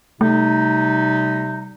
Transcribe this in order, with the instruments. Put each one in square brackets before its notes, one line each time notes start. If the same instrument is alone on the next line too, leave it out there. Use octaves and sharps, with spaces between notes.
[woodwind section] C3 G3 D#4 [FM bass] A3